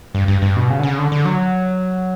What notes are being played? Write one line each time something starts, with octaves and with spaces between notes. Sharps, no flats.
G2
G2
G2
B2
C#3
D3
C#3
D3
D3
F#3